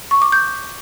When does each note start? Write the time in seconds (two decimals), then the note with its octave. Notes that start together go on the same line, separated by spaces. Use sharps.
0.11 C#6
0.22 D6
0.32 G6